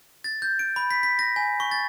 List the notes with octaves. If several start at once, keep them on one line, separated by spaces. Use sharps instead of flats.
A6
G6
D7
B5
B6
B6
A#6
G#5
C#6
A6